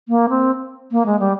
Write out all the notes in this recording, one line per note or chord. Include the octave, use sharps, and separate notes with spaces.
A#3
C4
A#3
G#3
G3